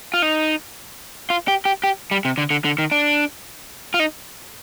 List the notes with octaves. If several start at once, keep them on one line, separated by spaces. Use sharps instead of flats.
F4
D#4
F4
G4
G4
G4
G3
C3
D3
D3
D3
D#3
D4
F4
D#4